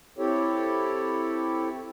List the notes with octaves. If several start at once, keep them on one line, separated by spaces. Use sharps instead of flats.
C4 E4 G4 A4 C#5